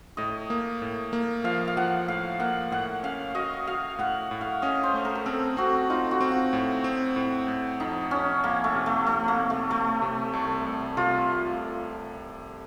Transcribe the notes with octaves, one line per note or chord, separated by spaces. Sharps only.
A2 D#5
A#3
A2
A#3
F3 F5
F5
F3 F#5
A2 F5
A#3 F#5
A2 F#5
C#4 F5
F#4 D#5
F#4 F5
A2 F#5
A2
F5
C#4 D#5
C5
A3
A#4
A#4
C4 A4
C4 F#4
D#4 F4
F#4
C4
F#4
A2
C4
A2
A2
F2 D#4
F2 C#4
F2 A#3
A3
C3
A3
F2 A3
A#3
C3
A3
C3 A3
C3
C2
C2
C3 F4